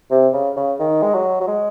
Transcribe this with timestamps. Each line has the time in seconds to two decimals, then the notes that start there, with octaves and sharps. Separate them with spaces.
0.11 C3
0.33 C#3
0.56 C#3
0.79 D#3
1.03 G#3
1.14 F#3
1.41 F#3
1.47 G#3